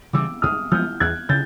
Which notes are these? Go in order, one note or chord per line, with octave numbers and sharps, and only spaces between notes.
C#3 E3 G3 D6 E6
G#2 D#6 F6
F3 G#3 B3 F6 G6
E2 F#6 G#6
C#3 G6 A6